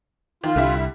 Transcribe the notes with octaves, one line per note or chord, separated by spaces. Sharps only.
D#3 F4
C2 D3 G3 E4